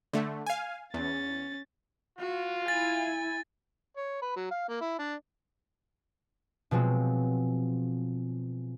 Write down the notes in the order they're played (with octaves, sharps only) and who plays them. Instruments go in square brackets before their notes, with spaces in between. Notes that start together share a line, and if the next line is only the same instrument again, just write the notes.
[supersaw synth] D3 A3
F5 G#5
[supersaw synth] E2 [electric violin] C#4 A6
[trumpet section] F4 [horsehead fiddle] F#4
[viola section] E4 [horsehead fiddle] G#5 [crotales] A6
[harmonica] C#5
B4
F#3
F5
A#3
E4
D4
[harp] B2 F3 F#3 G#3 C4